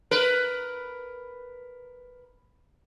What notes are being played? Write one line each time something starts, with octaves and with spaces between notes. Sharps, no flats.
A#4 B4